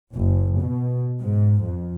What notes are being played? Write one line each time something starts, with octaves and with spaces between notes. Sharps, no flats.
F#1
B2
G#2
F2